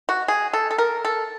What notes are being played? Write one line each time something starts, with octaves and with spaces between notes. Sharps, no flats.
F#4
G#4
A4
A4
A#4
A4